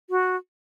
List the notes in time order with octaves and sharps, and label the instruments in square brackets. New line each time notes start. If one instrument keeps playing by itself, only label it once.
[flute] F#4